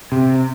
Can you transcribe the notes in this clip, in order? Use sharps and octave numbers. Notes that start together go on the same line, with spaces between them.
C3